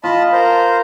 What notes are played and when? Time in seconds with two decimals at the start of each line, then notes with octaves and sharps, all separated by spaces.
0.04 F4 D#5 A5 B5
0.32 A#4 C5